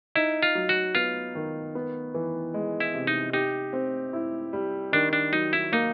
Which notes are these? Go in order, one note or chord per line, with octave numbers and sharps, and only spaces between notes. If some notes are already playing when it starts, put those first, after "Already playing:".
D#4 E4
F4
F#3
F#4
B3 F4
D#3
B3
E3
G#3
E4
C3
D#4
D#4 G4
C4
E4
G3
D#3 D4
D4
F#3 D#4
E4
A#3 D#4